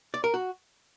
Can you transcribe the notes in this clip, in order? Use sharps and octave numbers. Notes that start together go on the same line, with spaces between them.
D5
A#4
F#4